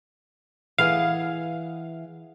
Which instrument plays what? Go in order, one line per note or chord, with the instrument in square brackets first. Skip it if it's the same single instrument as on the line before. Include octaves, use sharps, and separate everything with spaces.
[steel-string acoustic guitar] E3 G#4 F#5 [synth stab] F5